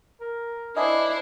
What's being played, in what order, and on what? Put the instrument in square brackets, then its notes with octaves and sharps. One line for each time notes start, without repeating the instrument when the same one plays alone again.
[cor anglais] A#4
[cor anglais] D4 [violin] E4 C5 [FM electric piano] D#5 E5 G#5